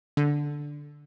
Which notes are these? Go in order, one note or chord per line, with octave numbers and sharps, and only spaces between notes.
D3